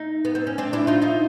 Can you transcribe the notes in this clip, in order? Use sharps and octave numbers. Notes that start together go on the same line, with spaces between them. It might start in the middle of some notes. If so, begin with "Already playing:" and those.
Already playing: D#4
B3
C4
C#4
C4 D4
D4 E4
D#4 F4
D#4 F4